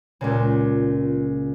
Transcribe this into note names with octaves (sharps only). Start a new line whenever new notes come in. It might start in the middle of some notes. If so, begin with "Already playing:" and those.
C#2 A#2 C#3